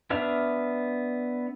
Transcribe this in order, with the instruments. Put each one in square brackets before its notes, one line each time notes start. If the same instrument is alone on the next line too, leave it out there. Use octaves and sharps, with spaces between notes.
[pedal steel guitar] B3 D4 E5 F6